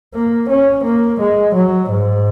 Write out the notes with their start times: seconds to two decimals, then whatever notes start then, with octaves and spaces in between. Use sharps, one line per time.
0.14 A#3
0.50 C#4
0.85 A#3
1.20 G#3
1.55 F#3
1.91 G#2